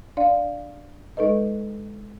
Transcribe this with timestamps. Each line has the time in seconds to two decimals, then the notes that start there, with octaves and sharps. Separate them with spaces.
0.17 D4 D5 F5
1.17 G#3 D#4 A4 B4 D#5